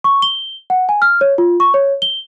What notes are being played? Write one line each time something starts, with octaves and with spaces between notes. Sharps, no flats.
C#6
G7
F#5
G#5
F6
C#5
F4
C#6
C#5
G7